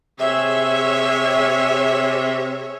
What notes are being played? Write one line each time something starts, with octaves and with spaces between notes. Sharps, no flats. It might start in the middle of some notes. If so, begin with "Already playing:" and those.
C3 G#4 C#5 E5